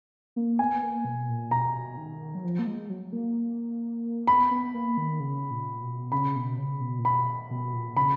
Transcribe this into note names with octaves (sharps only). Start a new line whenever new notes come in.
A#3
B3 G#5
A#3
B2
A#2
B2 A#5
D#3
F#3
F3
A#3
G#3
F#3
A#3
B3 B5
B3
A#3
D#3
C#3
A#2
B2
C#3 B5
B2
C#3
B2
A#2
B2 B5
B2
A#2
C#3 B5